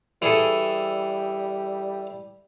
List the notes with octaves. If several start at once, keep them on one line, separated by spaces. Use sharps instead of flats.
E3 G3 G#4 A4